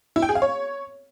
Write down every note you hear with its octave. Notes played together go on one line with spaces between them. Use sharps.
E4
G5
G#4
F5
C#5